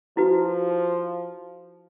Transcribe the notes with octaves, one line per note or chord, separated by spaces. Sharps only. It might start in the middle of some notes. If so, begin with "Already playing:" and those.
F3 E4 F#4 B4